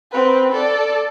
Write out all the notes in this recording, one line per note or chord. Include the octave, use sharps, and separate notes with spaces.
C4 B4
A4 D5